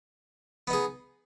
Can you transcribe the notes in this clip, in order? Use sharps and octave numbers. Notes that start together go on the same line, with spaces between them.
B3 D#4 G#4